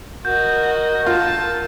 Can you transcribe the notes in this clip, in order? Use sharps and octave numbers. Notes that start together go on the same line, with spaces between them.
F#4 A#4 D#5 G6
F4 A4 A5